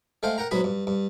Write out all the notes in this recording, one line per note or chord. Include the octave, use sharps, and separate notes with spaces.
G#3 A3 C5 F5 G5
A#4 F#5 G5 A#5
G#2 F#3 B3 F#4 B5
G2
G2